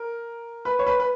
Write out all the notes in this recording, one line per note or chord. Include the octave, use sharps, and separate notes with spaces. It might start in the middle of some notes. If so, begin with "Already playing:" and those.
Already playing: A#4
B4
C#5
B4
B4